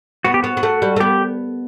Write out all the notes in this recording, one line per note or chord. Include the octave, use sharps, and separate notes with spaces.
B3 F#4
G4
B3 F#4
B3
A3
G3
A3
B3 G4